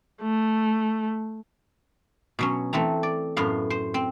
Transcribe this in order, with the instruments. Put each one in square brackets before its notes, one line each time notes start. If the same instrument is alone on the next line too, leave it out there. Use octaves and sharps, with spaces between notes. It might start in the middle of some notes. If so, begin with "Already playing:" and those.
[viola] A3
[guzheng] B2 F#3 C#4
E3 A3 C4 A#5
D5
F#2 A2 B3 F5
C5
C4